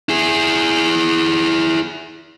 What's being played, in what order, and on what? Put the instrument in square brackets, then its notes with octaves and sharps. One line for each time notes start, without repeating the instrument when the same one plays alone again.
[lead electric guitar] E4 G#4